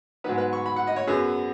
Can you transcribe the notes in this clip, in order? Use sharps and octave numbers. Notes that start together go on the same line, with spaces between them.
G#2 F#3 B3 B4
B4
C#6
B5
F#5
D#5
C#5
F#2 F#3 B3 G#4